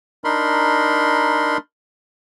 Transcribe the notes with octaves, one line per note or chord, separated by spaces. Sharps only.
D4 D#4 A#4 B5 C6